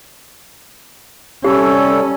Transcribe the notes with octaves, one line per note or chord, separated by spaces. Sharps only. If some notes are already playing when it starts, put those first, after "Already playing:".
C3 G3 C#4 G4 A4